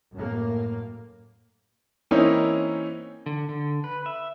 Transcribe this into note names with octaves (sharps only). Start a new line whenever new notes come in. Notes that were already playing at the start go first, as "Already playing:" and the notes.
F#2 A2 A#3
E3 A#3 C4 C#4 D#4 E4
D3
D3
B4
E5